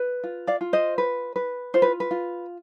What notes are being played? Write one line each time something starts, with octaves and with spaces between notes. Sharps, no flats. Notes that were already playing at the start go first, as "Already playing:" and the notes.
Already playing: B4
F4
D5 F5
F4
C5 D#5
B4
B4
F4 C5
B4
B4
F4